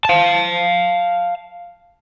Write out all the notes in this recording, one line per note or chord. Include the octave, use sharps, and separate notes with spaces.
F5 A5